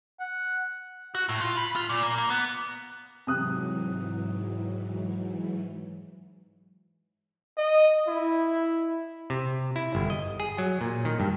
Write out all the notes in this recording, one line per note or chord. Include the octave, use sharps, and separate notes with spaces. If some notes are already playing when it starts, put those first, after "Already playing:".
F#5
F#4
A2
F4
B5
F4
A#2
A#3
A#3
B3
G#2 C3 E3 F#3 D#6 F#6
D#5
E4
C3
E4
G1
D#5
G#4
F#3
A#2
D#3
G2